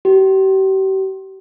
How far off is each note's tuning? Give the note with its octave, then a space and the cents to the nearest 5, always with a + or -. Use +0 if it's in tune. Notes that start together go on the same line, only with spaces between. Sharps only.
G4 -40